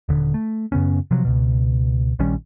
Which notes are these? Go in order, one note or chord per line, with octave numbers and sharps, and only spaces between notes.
D#1 D3
A3
F#2 C#3 B3 C#4
C3 F3 F#3
C#2 B2
A#1 D#3 G3 C#4